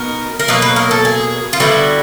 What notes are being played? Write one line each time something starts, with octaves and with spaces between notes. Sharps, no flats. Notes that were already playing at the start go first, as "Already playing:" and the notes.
Already playing: B2 B3 D#4 A#4
A#4
B2 F#3 A#3 B4
B4
A#4
A4
G#4
F4
D3 G3 B3 E4 F#4